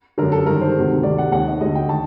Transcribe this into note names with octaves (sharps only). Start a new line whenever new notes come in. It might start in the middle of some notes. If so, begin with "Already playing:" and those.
F#2 D3 A#4
A4
G2 D#3 A#4
C5
D2 C3 D#3
D2 C3 D#3 D5
F#5
D#2 D#3 F#5
D#5
D2 D3 D#5
G5
D#3 A5